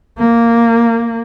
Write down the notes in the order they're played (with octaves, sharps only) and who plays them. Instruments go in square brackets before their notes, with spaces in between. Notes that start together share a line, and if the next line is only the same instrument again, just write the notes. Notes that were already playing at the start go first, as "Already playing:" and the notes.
[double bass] A#3